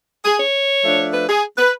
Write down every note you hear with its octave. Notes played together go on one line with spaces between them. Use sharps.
G#4
C#5
F3 A3 D4
B4
G#4
B4